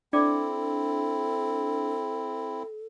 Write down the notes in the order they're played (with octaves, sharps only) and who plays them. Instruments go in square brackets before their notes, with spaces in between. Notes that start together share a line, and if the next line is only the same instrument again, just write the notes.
[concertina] C4 E4 [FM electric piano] D4 [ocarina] A4 [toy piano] D5 D6